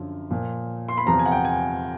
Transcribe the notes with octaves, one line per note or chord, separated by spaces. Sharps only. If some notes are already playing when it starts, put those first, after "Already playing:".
Already playing: F#2 D3 F3
A#2 F3
C6
B5
E2 C3 F3 A#5
G#5
F#5
G5
G#5